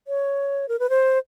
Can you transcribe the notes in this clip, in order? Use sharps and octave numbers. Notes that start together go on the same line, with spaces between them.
C#5
A#4
B4
C5